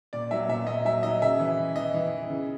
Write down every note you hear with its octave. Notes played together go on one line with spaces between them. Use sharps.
A#2 D5
F#3 E5
A#2 E5
A#2 D#5
F#3 E5
F#3 D#5
C#3 E5
E3
E3
E3 D#5
E3
E3
C#3